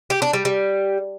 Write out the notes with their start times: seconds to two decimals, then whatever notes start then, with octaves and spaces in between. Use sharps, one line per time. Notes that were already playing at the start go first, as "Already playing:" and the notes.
0.10 G4
0.22 D4
0.33 G3
0.45 G3